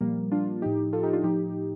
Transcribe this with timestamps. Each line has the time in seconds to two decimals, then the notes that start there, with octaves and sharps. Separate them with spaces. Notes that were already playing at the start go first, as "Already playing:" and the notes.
0.01 A#2 F3 G3 A#3
0.31 D4 F4
0.62 A2 F3 D#4 G4
0.93 F4 A4
1.03 D#4 G4
1.13 D4 F4
1.23 A2 F3 D#4 G4